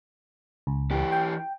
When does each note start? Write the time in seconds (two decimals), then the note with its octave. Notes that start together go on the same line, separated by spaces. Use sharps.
0.67 C#2
0.91 E3 G4
1.12 G5